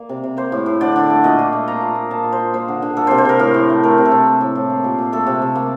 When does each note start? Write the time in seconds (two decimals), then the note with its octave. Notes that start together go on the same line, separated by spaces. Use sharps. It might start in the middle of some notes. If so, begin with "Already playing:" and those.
Already playing: A#3 D5
0.09 C3
0.24 C3
0.37 A#3 C5
0.52 A2
0.66 A2
0.81 D3 D5
0.96 D3
1.10 A3
1.24 A#2 D#5
1.39 A#2
1.53 A3
1.68 A#3 A#5
1.81 A#2
1.95 A#2
2.10 A#3 A5
2.24 A#2
2.32 C5
2.40 A#2
2.54 A#3 C5
2.68 D3
2.82 D3
2.97 A#3 A4
3.07 C3 C5
3.18 C5
3.25 C3 A#4
3.39 A2 A#4
3.54 A2
3.69 A3
3.84 A3 A#4
3.98 C3
4.05 A4
4.12 C3
4.26 A#3
4.41 A2
4.56 A2
4.70 A#3
4.84 A#2
4.99 A#2
5.13 A3 A4
5.27 C3
5.42 C3
5.56 A#3